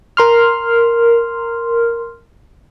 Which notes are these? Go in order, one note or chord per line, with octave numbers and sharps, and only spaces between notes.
A#4 C6 F6